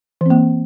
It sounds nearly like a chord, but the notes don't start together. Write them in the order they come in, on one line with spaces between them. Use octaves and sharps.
E3 C4 A#3